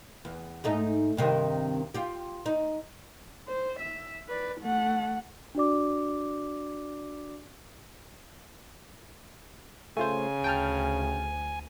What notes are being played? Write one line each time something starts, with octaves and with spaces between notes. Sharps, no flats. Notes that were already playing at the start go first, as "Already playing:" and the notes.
E2
G#2 A3 D#4
G2 C3 D#3
F4 G4
D#4
C5
E5
B4 D5
A3 F#5
D4 F#4 D5 D6
C#3 A3 F4 C5 G#5
D2 G5 A5 F6